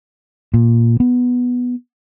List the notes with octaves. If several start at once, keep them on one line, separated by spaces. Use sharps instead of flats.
A#2
B3